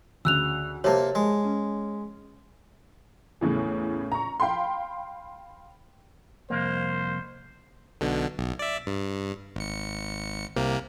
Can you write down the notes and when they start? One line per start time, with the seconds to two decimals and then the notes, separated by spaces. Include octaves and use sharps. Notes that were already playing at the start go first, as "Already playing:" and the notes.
0.25 D2 C#3 E6 F#6 F7
0.84 C3 A#3 G4 A#4 C#5 A5
1.15 G#3
1.44 C#4
3.41 E2 A2 C#3 E3
4.12 A#5 C#6
4.40 F5 G5 B5 C6
6.50 C2 F2 A#3 C5
8.01 B1 B2 D3
8.38 B1
8.59 D5 E5
8.87 G2
9.56 G#1 C#7
10.56 C2 C3 A#3